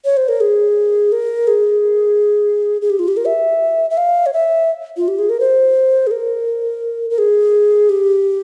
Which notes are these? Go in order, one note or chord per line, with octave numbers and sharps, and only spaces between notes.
C#5
C5
A#4
G#4
A#4
G#4
G#4
G4
F4
G4
A#4
E5
E5
F5
C#5
E5
F4
G4
G#4
A#4
C5
G#4
A#4
A#4
G#4
G4